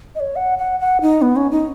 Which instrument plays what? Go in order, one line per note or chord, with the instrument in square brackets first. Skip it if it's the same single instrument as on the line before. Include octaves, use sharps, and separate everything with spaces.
[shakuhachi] D#5
C#5
F#5
F#5
F#5
D#4
B3
C#4
D#4